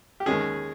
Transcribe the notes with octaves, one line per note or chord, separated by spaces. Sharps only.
G4
D#2 D#3 G#3 C#4 G#4